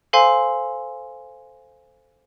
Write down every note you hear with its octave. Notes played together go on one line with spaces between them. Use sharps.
A4 C5 F5 G#5 C6